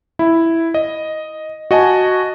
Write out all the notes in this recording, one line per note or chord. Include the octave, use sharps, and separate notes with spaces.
E4
D#5
F#4 D#5 G#5 A5